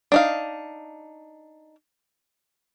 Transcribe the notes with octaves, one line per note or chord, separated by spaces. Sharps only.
D4 D#4 F5